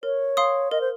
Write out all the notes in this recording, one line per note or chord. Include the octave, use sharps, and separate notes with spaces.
A#4 C#5
F5 C6 D#6
A#4 D#5
C5